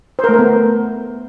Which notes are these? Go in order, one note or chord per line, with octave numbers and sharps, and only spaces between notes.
C5
A#4
A3
A#4
B3